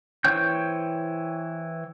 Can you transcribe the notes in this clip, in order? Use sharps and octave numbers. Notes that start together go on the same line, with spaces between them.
E3 C5 C#5 G5 G6